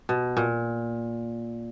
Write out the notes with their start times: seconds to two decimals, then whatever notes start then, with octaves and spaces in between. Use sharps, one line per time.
0.09 B2
0.37 A#2